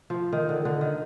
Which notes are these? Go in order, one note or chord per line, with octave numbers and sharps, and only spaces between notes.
F3
D#3
D3
D3
D#3